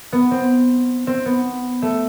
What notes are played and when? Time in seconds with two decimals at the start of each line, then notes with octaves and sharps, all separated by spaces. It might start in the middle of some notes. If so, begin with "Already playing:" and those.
0.12 B3
0.31 C4
1.07 C4
1.26 B3
1.82 A3